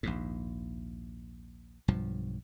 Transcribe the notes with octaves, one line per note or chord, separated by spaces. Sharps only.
A#1 D#2 G#2
B1 G2 F3